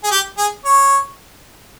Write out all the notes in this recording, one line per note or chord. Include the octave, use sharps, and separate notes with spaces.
G#4
G4
G#4
C#5